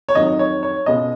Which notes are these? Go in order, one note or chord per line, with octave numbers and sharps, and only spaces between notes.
C#5
F2 D#3 F#3 D#5
C#5
C#5
C#2 B2 G#3 D#5